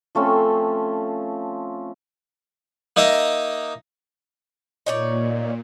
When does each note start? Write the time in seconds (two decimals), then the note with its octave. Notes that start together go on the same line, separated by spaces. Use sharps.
0.15 F3 A3 C4 C#4
2.96 A#3 D#4 A#4 D#5 E5
4.86 A#2 D#4 C#5 D5